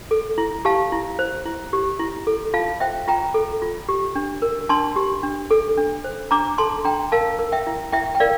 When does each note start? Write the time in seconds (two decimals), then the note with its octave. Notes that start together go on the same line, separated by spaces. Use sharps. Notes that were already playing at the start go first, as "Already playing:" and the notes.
0.11 A4
0.38 E4
0.65 G4 F5 A5
0.92 E4
1.19 C5
1.46 E4
1.73 G4
1.99 E4
2.27 A4
2.54 F4 F5 A5
2.80 C5 E5 G5
3.08 F4 G5 A#5
3.34 A4
3.62 F4
3.89 G4
4.16 D4
4.42 A#4
4.69 D4 A5 C6
4.96 G4
5.23 D4
5.51 A4
5.77 D4
6.04 C5
6.31 D4 A#5 D6
6.58 A4 A5 C6
6.85 D4 G5 A#5
7.12 A#4 F5 A5
7.39 A#4
7.52 E5 G5
7.67 E4
7.93 E4 E5 G5
8.15 G5
8.20 A#4 D5 F5